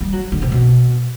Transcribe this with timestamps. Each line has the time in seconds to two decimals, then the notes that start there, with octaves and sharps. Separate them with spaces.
0.01 G3
0.13 F#3
0.32 D3
0.42 C3
0.52 B2